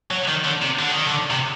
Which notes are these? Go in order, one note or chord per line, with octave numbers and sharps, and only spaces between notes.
F#3
D#3
D3
C3
D3
D#3
D3
C3